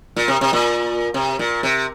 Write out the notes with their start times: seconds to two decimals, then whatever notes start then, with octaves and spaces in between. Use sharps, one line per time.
0.16 A#2
0.28 C3
0.41 C3
0.53 A#2
1.14 C3
1.39 A#2
1.63 C3